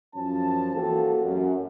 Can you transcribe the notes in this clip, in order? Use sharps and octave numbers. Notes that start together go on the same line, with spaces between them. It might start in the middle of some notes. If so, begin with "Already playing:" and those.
F#2 F3 C#4 A5
E3 A#3 C4 F#4 G4 A4
F#2